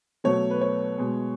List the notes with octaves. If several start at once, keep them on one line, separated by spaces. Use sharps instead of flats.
B2 F#3 A3 C#5
B4
C#5
B2 G#3